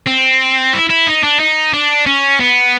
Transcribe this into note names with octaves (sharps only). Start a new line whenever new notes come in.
C4
E4
E4
D#4
D4
D#4
D4
C#4
B3